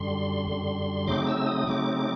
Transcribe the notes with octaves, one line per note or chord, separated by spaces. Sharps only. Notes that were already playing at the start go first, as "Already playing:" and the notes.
Already playing: F#2 D3 G3 C6
F#2 D3 G3
C#3 F#3 A3 C4 D#4 D6
E6
D#6
C#3 F#3 A3 C4 D#4 D6
D6